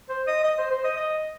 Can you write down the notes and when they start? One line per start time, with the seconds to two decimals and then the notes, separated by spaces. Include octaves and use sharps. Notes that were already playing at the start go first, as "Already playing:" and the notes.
0.09 C5
0.27 D#5
0.43 D#5
0.58 C5
0.70 C5
0.84 D#5
0.97 D#5